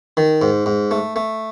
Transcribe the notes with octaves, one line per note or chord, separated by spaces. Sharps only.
D#3
G#2
G#2
A3
A3